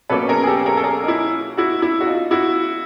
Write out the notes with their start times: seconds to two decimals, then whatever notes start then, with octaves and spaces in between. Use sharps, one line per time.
0.10 B2 F#3 A#3 C#4 A4 B4
0.28 G#4 A#4
0.43 G#4
0.47 G4 A4
0.65 G#4 A#4
0.77 A4
0.83 G#4 A#4
1.03 D#4
1.08 E4
1.57 E4 F#4
1.82 E4
2.00 F#4
2.07 D#4 F4
2.31 E4 F#4